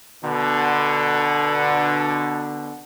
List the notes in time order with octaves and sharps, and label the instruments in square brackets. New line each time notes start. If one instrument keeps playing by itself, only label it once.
[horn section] B2 D3